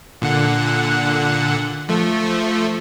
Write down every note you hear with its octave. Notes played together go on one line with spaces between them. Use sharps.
A#2 D3 F#5
F3 A3